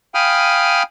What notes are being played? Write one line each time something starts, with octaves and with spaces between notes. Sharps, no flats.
F5 G5 G#5 B5 D#6 F6